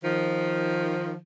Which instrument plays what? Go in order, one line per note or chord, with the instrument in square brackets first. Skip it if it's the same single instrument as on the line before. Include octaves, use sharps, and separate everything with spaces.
[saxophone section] D#3 F3